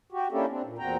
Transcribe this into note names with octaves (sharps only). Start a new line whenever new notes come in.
F#4 G4
A#3 C#4 D4 E4 G4 A4
C4 D4
A#2
E2 A#2 C4 F#4 G5 A#5